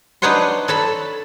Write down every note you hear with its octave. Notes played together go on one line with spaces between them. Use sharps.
D4 D#4 B4 C#5 F#5 C6
A4 C#5 A5 B5